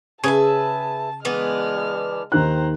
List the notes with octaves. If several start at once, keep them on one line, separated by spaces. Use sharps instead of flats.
C#3 G#4 B4 E5 A5
E3 G#3 B3 D4 F6
D#2 D#3 C5 A#5 F#6